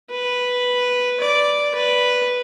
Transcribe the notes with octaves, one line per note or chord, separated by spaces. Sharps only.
B4
D5
B4